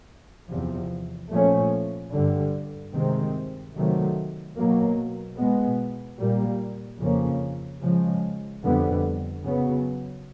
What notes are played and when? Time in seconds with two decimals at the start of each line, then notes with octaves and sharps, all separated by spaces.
0.49 E2 C3 F3
1.31 A#2 F3 A3 C#4
2.12 G2 D3 G3
2.94 C3 D#3 G#3 C4
3.74 C3 D#3 F#3 A3
4.56 B2 F#3 A#3
5.37 B2 G#3 B3
6.18 A#2 G3 A#3
6.99 F2 C#3 F3 A#3 C#4
7.80 C#3 F3 G#3
8.62 F2 D3 G3 B3
9.43 C#3 F#3 B3